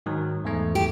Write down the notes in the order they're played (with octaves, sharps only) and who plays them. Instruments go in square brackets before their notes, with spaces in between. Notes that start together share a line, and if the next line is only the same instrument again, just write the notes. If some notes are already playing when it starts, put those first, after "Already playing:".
[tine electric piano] G#2 D#3 F#3
E2 G#2 A3
[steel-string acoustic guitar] G4